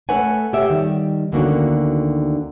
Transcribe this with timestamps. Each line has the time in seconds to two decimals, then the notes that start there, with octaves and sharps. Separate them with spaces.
0.09 A3 A4 B4 C#5 F#5 G#5
0.53 G4 C#5 E5 F#5 G5
0.70 D#3 G3
1.32 D2 D3 D#3 A#3 C#4 F#4